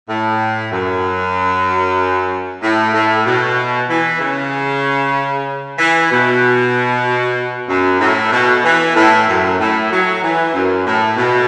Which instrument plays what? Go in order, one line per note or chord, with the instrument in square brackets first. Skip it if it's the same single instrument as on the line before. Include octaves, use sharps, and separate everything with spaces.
[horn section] A2
F#2
A2
A2
B2
E3
C#3
E3
B2
F#2
A2
B2
E3
A2
F#2
A2
F#3
E3
F#2
A2
B2